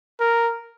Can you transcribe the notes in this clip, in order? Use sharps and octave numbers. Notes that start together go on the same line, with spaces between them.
A#4